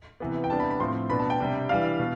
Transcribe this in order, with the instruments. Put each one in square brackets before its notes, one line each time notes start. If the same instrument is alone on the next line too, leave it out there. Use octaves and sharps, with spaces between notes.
[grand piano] C3 E3 B3
G5
C3 G3 B3 D4 A5
B5
B5
A2 F3 C4 C6
B2 B3 D4 B5
A5
G5
C3 G3 D4
E3 G3 D4 F5
B2